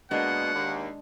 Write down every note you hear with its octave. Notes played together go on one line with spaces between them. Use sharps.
B2 G#3 A#3 D4 F#5
D#2